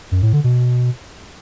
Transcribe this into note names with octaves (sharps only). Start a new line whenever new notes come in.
F#2
A2
D3
B2